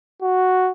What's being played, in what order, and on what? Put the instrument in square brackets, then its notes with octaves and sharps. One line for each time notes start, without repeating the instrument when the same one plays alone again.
[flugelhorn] F#4